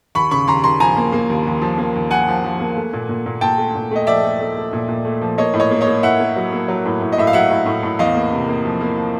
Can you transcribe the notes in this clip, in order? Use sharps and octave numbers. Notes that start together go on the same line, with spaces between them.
D#2 B5 C#6
C#3 B5 C#6
D#2 A#5 C6
D#2 A#5 C6
F3 G#5 A#5
A#3
A#3
D#2
D#2
F3
A#3
D#2
F3 F#5 G#5
F3
F3
A#3
A3
A#2
A#2
A#2
A#2 G5 A5
A3
A#2
A3 D#5
F3 D5 E5
A3
A3
A3
A#2
A#2
A3
F3
A#3 C#5 D#5
A2
C#5 D#5
A#3
C#5 D#5
A#3
A2 E5 F#5
A#3
F#3
A#3
F#3
A2
A2
D#5
A2 E5
F5
F#3 E5 F#5
A2
A2
A2
E2 D#5 F5
A#3
C3
A#3
F3
A#3
F3